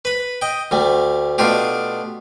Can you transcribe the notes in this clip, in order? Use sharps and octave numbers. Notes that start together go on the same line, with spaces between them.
B4 B5
D#5 G5
D2 G3 A3
B2 A3 D4 F4 G4